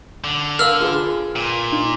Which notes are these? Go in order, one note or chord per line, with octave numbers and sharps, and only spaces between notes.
D3
A#4 F5 E6 F6
F4 G#4 B4
A#2
D#4